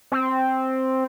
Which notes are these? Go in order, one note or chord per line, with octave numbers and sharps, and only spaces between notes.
C4